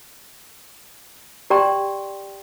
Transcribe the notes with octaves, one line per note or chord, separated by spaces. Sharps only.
G4 D5 G5 A#5 C6